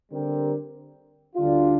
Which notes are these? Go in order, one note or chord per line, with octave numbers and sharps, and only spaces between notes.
D3 G3 C4 G4 A#4
D2 D3 G3 D4 F4